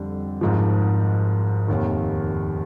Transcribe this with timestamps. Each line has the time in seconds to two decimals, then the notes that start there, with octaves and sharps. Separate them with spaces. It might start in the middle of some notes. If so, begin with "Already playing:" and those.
Already playing: F2 D3 G3
0.41 G#1 G#2 F3
1.68 F1 D#2 D#3